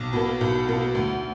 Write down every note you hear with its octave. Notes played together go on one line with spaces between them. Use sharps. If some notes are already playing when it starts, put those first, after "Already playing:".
Already playing: B1
B2 A#3
B1
B2 A#3
D2